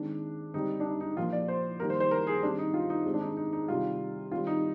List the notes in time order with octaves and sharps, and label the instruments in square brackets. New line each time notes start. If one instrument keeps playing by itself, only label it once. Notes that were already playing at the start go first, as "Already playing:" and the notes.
Already playing: [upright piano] D#3 G#3 C4 D4
D3 G3 C4 D#4
D4
D#4
D#4
A#2 F3 A#3 F4
D5
C5
D#3 G3 A#3 A#4
C5
C5
A#4
G#4
D#3 G3 C4 D4
D#4
F4
D#4
D#3 G#3 C4
D4
D#4
D#4
D#4
C3 D#3 G3 F4
D#3 G3 C4 F4
D#4